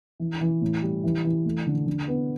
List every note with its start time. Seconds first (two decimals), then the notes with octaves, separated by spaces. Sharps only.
0.20 E3
0.41 E3
0.62 A2
0.83 G3
1.04 E3
1.25 E3
1.46 A3
1.67 D3
1.87 D3
2.08 B3